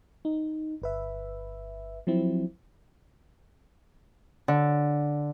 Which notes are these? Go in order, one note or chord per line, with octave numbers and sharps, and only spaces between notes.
D#4
G1 B4 E5
F3 F#3 C4 E4
D3